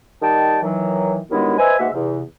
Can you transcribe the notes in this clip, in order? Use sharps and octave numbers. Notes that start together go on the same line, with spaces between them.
D#3 G3 D#5 G5 A5
D#3 E3 F#3
G2 D#3 F#3 G#3 B3 E4
B4 C5 D#5 E5 G#5
G#2 B2 G#3 A#3 E5 F#5
E2 C3